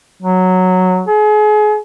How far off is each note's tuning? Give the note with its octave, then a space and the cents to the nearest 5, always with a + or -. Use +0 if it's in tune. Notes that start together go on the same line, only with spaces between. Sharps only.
F#3 -5
G#4 +35